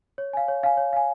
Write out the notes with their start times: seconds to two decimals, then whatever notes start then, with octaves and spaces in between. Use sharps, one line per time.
0.18 C#5
0.33 F5 G#5
0.48 C#5
0.63 F5 G#5
0.77 C#5
0.93 F5 G#5